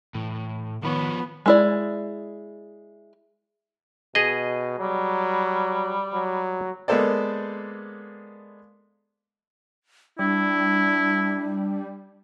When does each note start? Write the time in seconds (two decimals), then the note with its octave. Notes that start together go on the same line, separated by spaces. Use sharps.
0.14 A2 E3
0.84 D#3 F3 B3 F4 C#5 B5 C#6
1.46 G#3 E4 D5
4.15 B2 G#4 D#5
4.79 F#3 G3
6.13 F#3
6.88 G#3 A#3 B3 A4 C5 D5
10.19 G3 D4 E4